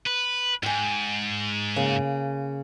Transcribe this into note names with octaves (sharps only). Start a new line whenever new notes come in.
B4
G#2 G5 G#5
C#3 A#3